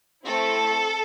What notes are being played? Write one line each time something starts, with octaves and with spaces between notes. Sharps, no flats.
A3 C4 E4 A4